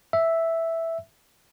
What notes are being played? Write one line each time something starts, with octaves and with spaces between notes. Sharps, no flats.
E5